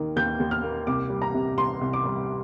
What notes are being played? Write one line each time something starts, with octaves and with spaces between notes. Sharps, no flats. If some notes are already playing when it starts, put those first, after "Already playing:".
Already playing: D#2 D#3 A#3
D#2 G6
D#2
F6
A#3
C2 D6
G3
A#5
C3
C2 C6
C2
D6
G3